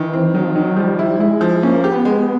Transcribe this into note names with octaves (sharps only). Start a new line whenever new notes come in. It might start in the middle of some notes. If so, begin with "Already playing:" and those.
Already playing: D#3 E3
C4
D#3 F#3
F3
D#3 F#3
F3 G3
E4
G#3 E4
F3
A#3 C#4
G4
B3
G#3
B3